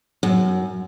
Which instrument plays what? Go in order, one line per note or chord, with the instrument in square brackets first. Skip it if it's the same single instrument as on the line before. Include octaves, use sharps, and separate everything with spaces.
[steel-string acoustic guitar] F#2